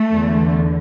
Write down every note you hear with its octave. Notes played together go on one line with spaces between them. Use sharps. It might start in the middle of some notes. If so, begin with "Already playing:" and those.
Already playing: A3
E2 D3